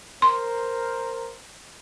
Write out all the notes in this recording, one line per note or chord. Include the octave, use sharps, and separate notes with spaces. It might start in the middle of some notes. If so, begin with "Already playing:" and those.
A#4 C5 C6